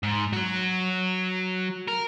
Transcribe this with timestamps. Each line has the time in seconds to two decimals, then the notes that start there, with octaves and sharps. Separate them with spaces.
0.03 G#2
0.33 F#3 F#4
1.88 A#4